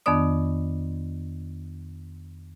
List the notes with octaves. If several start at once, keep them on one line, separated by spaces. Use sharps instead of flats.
F2 D#3 B3 D4 D5 D#6